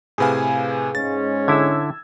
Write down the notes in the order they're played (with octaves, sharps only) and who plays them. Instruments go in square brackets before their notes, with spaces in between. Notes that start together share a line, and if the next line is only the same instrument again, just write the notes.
[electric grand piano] A2 C3 G#5 [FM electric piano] G#4 B4 F5
[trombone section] G#2 G#3 C#4 [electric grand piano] A6
[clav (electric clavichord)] D3 E4 [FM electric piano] E6 G#6